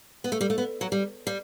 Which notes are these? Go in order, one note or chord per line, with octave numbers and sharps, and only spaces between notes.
B3
A3
G3
A3
B3
F#3
G3
G3